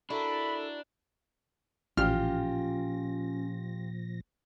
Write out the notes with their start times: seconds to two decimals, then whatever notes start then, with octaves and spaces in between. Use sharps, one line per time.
0.10 D4 E4 F#4 A4 A#4 B5
1.97 A1 A#2 F3 C#4 F4 G4 F6 A#6